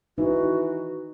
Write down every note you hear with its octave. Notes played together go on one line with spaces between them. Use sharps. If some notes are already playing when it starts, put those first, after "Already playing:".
E3 D#4 F#4